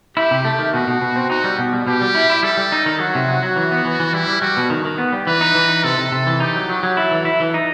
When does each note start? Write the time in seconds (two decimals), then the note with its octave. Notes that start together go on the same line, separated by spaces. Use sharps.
0.17 E4 G4
0.31 C3
0.45 A3
0.59 D#3
0.73 B2 F#4
0.87 B2
1.01 B2
1.16 C4
1.30 D#4 F#4
1.44 G3
1.59 B2
1.73 G3
1.87 B2 G4
2.01 G3
2.15 E4
2.30 E4
2.43 G3 A4
2.57 G3
2.72 D#4
2.86 D#3
3.00 F#3 F#4
3.15 C3
3.28 F#3
3.43 F#3
3.56 E3
3.71 B3
3.85 E3
4.00 E3
4.13 G3 E4
4.27 G3
4.41 G3 F#4
4.57 B2
4.70 D#3
4.85 D#3
4.98 B3
5.13 G3
5.27 E3 B4
5.41 D#4
5.55 E3
5.69 D#4
5.84 C3 A4
5.98 C3
6.12 C3
6.27 E3
6.40 D#4 G4
6.54 F#3
6.69 F#3
6.83 F#3
6.97 E4 A4
7.11 E3
7.25 E4
7.40 E3
7.54 D#4